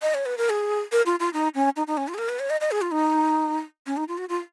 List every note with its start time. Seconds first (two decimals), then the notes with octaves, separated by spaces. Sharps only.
0.02 D#5
0.14 C#5
0.26 B4
0.38 A#4
0.50 G#4
0.92 A#4
1.06 F4
1.20 F4
1.34 D#4
1.55 C#4
1.76 D#4
1.87 D#4
1.97 C#4
2.08 F4
2.14 G#4
2.18 A#4
2.29 B4
2.39 C#5
2.50 D#5
2.61 D#5
2.71 G#4
2.81 F4
2.91 D#4
3.86 C#4
3.97 D#4
4.08 F4
4.18 F#4
4.29 F4